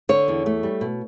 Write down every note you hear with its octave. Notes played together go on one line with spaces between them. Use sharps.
D3 C#5
E2
A3
G3
B2